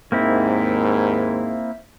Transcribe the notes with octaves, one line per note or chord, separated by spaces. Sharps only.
D#2 G#2 A#3 C4 E4